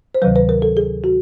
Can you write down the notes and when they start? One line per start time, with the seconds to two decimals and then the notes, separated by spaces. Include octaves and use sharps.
0.15 C5
0.22 D2 C3 D#3 F#3 B4
0.36 B4
0.49 A#4
0.62 A4
0.77 G#4
1.04 F#4